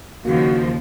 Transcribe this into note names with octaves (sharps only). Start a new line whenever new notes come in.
D#2 C#3 F3 A#3 F#4